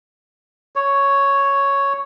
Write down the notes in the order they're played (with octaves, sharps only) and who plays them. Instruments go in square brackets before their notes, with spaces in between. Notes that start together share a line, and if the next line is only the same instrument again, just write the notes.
[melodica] C#5